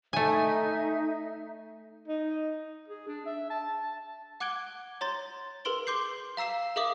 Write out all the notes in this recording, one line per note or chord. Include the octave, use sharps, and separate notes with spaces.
A3 D#4 E5 G#5
D#4
G#4
D4
E5
A5
A5
F#5 D6 F#6 G#6 D7 G7
C#5 A#5 C6 A6
G#4 A#4 B4 C6 D7 G7
C6 D6 G6 C7
F5 A#5 E6 C7 E7
G#4 A#4 E5 F5 D6 D#6